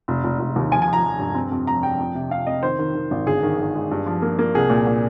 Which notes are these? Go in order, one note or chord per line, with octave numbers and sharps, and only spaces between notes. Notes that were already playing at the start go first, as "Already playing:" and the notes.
F1
F1
F1
D#2
F3 G#5
G#5
F3
A#5
F3
G2
C4
F2
F3 A#5
F3 G5
F2
C3
C3 F5
F2 D#5
D#3 C5
D#3
D#3
G#1
G1 G#4
D#3
D#3
G#3
G2
F3
A#3
A#3
C2 G#4
A#2
A#2